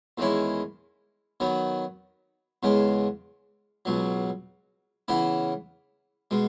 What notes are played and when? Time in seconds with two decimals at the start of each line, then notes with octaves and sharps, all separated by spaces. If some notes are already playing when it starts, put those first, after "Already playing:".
0.18 E2 D#3 G#3 C#4 E4
1.40 D#3 F#3 B3
2.63 E2 C#3 G#3 B3
3.85 C#2 B2 F#3
5.08 C#3 E3 B3 E4
6.31 B2 G#3